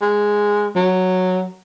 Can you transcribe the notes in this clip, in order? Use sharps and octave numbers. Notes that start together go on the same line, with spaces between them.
G#3
F#3